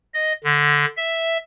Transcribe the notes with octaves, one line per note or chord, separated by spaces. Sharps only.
D#5
D3
E5